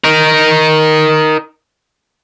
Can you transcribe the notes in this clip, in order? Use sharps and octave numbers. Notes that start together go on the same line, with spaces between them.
D#4 A#4